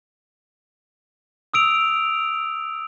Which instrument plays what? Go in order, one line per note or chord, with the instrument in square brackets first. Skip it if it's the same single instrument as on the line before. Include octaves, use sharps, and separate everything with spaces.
[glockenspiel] D#6 E6 D7 F7